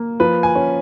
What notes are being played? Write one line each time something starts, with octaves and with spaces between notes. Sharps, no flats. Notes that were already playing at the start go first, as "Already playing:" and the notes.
Already playing: A#3
F3 B4
G#5
C#4